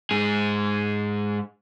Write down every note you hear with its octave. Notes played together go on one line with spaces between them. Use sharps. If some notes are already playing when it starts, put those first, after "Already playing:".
G#2 G#4